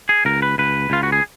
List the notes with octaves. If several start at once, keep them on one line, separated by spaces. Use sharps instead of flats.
G#4
C#2 A#4
B4
C#2 B4
C#2 F4
F#4
G#4